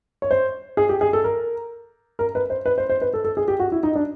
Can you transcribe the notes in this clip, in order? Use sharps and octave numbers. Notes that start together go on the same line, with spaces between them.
C#5
C5
G#4
G4
G#4
A4
A#4
A#4
B4
C5
B4
C5
C5
B4
A4
A4
G#4
G4
F#4
E4
D#4
D4